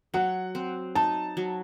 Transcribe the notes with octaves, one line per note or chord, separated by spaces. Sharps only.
F#3 F#5
C4
D#4 A5
F#3